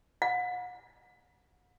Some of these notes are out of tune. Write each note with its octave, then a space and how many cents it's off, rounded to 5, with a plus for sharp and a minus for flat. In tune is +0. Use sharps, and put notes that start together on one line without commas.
F#5 -35